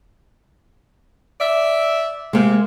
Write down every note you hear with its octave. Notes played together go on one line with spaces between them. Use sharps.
D5 E5
C3 G#3 A#3